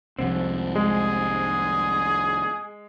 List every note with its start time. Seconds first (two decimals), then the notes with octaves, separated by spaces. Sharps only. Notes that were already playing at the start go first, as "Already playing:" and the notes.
0.19 C2 F2 G#2 C4
0.76 G#3 G#4